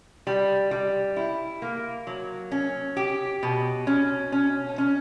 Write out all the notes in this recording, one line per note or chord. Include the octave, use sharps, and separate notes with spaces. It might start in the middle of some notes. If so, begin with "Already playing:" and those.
G3
G3
E4
A#3
F#3
C#4
G4
B2
C#4
C#4
C#4